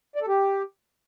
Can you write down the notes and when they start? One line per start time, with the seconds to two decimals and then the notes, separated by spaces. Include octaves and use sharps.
0.16 D5
0.22 A4
0.28 G4